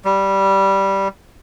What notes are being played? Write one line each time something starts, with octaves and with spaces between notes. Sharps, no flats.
G3